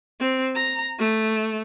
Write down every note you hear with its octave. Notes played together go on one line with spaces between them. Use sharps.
C4
A#5
A3